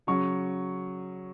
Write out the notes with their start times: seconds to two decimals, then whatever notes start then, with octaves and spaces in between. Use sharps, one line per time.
0.07 C#3 F#3 C#6